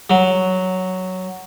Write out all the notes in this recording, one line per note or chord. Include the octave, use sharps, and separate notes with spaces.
F#3